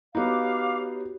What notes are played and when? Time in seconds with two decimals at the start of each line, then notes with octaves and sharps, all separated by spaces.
0.15 B3 D#4 F#4 G4 C#5 F5 D6